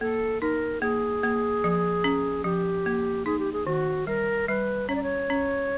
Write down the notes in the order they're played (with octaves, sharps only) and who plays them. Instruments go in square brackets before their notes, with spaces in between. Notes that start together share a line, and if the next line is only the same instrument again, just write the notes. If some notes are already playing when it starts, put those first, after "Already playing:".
[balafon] A#3 [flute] A4
[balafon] D#4 [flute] A#4
[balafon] A#3 [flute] G#4
[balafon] A#3
F3
C#4
[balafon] F3 [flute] G4
[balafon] A#3
[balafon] D#4 [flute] G#4
[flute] G4
G#4
[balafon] D#3 [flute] F#4
[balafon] G3 [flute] A#4
[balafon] G3 [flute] B4
[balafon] C#4 [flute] C#5
[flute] D5
C#5
[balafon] C#4